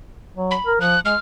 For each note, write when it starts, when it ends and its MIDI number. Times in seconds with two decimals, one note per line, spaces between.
0.34 0.55 54
0.51 0.73 83
0.67 0.78 70
0.81 0.96 53
0.81 1.00 90
1.05 1.15 56
1.05 1.19 89